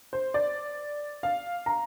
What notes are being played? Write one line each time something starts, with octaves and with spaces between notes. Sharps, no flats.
C5
D5
F5
A#5